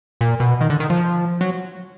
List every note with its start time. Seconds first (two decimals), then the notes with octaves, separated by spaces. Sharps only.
0.21 A#2
0.40 B2
0.61 D#3
0.70 D3
0.80 D#3
0.90 F3
1.41 F#3